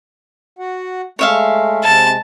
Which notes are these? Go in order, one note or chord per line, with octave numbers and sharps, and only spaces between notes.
F#4 F#5
G#3 A3 C#5 E5 F5
C3 G#3 A5